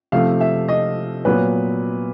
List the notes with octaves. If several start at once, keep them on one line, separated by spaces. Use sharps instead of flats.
C3 F3 A3 F5
E5
D#5
A#2 F#3 B3 B4